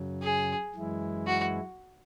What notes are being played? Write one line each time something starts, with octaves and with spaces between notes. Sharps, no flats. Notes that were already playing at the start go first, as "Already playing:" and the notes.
Already playing: F#2 C#3 F#3
G#4
F#2 E3 G#3 E4
F#4